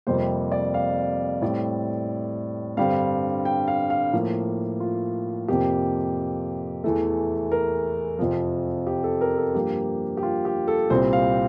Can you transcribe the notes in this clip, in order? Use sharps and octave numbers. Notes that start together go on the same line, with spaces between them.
F2 C3 G3 A#3 C5
D5
F5
A2 G3 C4 D5
G2 D3 G3 C4 F5
G5
F5
F5
A2 F3 A#3
F4
F2 C3 F3 A#3 G4
E2 E3 A3
A#4
F2 C3 F3
G4
A4
A#4
A4
G2 F3 A#3 G4
G4
F4
G4
A4
C2 A#2 G3 C4 C5
F5